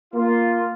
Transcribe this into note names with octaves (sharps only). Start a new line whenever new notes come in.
A#3 F4